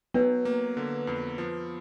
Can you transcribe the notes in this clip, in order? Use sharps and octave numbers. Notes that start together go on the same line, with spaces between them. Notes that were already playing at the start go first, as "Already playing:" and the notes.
F#3 B3 B4
A#3
D3
F2
F3